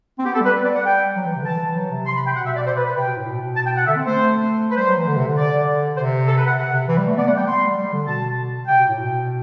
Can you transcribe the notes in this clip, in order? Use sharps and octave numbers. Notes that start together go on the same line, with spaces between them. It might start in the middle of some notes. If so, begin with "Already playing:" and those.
C4
B3 G4
A4
G3 B4
D5
F#5
G5
F#3
E3
C3
D3
E3 A5
F#3
C3
C6
B5
G5
B2 F#5
E5
D5
C5
B4
B4
C3 G5
B2
A2
B2
B2
A5
G5
F#5
D3 E5
C4
A3 C5
B4
G3 C5
F#3
E3
D3
C3
D3
D5
C3 C5
A4
B4
F#5
F#5
C3
E3
G3
A3
B3 D5
A3 F#5
G3 G5
C6
G3
D3
B2 A5
C3 G5
B2
A2
B2